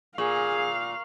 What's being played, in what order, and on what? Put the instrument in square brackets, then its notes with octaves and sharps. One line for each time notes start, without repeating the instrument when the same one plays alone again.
[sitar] A#2 [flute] G#4 [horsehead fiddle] F5 [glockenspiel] C#6 F#7